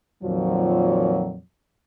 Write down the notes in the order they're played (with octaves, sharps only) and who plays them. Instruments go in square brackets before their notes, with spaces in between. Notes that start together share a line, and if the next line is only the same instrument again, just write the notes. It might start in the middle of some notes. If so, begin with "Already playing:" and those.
[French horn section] F2 A#2 D#3 F3 F#3